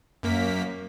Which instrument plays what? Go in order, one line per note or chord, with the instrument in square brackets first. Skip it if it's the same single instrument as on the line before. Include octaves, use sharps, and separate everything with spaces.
[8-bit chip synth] F#2 A#3 B6